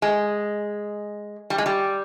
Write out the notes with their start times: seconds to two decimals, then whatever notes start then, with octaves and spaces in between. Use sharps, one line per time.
0.02 G#3
1.50 G3
1.58 G#3
1.66 G3